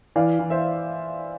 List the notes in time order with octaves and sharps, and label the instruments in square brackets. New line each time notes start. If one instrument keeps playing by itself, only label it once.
[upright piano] E3 D5 F5
E3
C5 E5